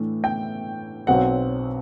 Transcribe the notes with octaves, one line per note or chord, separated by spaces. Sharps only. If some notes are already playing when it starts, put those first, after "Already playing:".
Already playing: A2 E3 A3 D4
G5
B1 B2 F#3 C4 F#5